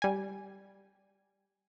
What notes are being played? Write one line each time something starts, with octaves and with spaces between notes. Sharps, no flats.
G3 G#5